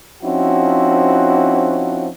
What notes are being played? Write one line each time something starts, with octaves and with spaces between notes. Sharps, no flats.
F3 C4 C#4 D#4 E4 F#4